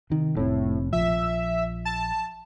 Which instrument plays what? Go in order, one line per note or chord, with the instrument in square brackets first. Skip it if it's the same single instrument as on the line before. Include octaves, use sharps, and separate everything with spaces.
[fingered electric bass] C3 D#3
[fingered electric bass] F1 C4 [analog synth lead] A2
[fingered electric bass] A#1 F3 [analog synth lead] E5
[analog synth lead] A5